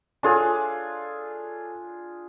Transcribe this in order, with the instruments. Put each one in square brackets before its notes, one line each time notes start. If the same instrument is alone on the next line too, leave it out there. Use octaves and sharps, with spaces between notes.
[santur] D4 F4 G#4 [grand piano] A4 C#5 G#5